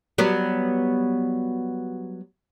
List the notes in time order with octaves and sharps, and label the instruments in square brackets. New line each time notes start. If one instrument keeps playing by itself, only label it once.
[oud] F#3 G3 B3